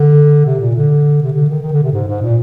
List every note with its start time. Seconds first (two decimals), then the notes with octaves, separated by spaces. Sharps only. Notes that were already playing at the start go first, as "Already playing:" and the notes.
Already playing: D3
0.46 C3
0.60 A#2
0.75 D3
1.22 C3
1.33 D3
1.49 D#3
1.62 D#3
1.72 D3
1.83 C3
1.92 G#2
2.07 G#2
2.22 A#2